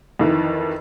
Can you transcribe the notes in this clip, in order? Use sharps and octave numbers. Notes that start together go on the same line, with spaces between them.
F2 D#3 E3